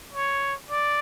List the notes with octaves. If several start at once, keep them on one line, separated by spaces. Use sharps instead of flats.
C#5
D5